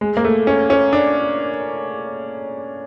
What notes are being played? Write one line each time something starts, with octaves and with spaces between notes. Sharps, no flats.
G#3
A#3
A3
C#4
C#4
D4